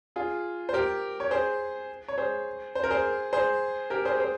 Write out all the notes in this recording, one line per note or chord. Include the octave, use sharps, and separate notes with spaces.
F4 G#4
C5
G4 A#4
C#5
G#4 C5
C#5
G#4 C5
C5
A#4
G#4 C5
G#4 C5
G4 A#4
G#4 C5
G#4 C5